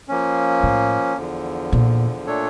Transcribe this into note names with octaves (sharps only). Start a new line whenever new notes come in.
F3 A#3 C#4
A2
E2 D3 F3
A#2
A#2 A3 D4 A4 C#5